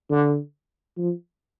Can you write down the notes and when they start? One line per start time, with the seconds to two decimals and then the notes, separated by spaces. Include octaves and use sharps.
0.10 D3
0.98 F3